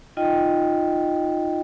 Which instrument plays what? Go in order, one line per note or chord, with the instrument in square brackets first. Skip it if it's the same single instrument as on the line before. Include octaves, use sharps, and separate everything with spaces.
[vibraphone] D#4 F4 D#5 G5